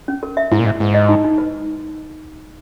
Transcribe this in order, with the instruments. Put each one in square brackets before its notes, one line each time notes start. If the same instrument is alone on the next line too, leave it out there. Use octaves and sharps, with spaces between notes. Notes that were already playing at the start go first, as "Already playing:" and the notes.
[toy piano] C#4
A#4
E5
[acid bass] G#2 [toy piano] E4
[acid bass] A#2
[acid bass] G#2 [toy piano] E5
[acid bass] G#2 [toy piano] B4
[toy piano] D#5
D#4
D#4
B4